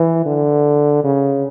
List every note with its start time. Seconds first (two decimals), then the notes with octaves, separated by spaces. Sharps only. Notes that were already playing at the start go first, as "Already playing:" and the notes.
Already playing: E3
0.26 D3
1.04 C#3